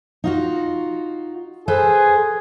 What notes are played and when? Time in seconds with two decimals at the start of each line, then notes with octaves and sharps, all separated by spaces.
0.24 D#4 F4 F#4
1.68 G#4 A4 B4 C5